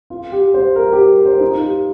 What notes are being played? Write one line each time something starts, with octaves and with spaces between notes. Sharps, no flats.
F4
G4
C5
A#4
G4
C5
D#4
F4
G4